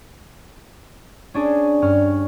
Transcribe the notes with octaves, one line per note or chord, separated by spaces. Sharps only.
C#4 D4 G#4
G2 C#4 F6